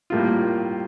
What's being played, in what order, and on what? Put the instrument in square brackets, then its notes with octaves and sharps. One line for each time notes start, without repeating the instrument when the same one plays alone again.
[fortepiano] A2 G3 A#3 F4